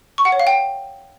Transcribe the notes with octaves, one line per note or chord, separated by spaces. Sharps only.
C#6
F#5
C#5
F5
G5